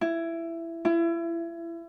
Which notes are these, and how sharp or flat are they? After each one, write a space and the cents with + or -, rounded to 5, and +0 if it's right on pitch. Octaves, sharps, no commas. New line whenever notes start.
E4 +15
E4 +30